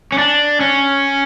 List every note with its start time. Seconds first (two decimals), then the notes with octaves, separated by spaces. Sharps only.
0.12 C#4
0.18 D4
0.60 C#4